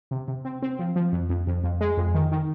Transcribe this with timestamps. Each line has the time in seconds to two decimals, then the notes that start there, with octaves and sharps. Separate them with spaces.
0.11 C3
0.28 C3
0.45 C4
0.62 C4
0.79 F3
0.96 F3
1.13 F2
1.30 F2
1.47 F2
1.64 F2
1.81 G#3
1.97 F2
2.15 D#3
2.32 D#3